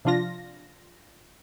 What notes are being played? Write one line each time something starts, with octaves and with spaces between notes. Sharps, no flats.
C3 F3 D4 F4 A#6